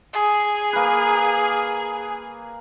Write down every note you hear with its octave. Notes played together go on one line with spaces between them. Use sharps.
G#4
A#3 B4